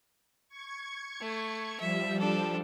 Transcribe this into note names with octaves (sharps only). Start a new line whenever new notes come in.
C#6 G#6 C#7
A3
F3 G3 E5
D4 A4